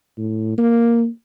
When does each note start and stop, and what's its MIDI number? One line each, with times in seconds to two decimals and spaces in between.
0.18 0.57 45
0.58 1.08 58